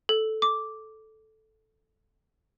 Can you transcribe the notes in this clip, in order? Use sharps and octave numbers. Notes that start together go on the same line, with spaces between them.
A4
D6